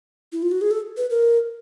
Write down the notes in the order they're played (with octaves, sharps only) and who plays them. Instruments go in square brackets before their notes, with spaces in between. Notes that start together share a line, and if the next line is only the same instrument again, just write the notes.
[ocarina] E4
F4
F#4
G#4
A4
B4
A#4